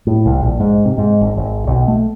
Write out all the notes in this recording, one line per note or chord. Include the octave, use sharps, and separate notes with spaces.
A2
C2
A#1
G#2
C3
G#2
G#1
G#1
B1
A3